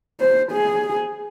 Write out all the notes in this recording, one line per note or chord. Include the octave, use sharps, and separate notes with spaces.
C5
G#4